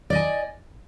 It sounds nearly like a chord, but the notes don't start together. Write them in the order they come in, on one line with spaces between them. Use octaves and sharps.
D5 D#5 G#5